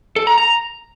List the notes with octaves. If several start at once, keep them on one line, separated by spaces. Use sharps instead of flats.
A4
A#5
A#5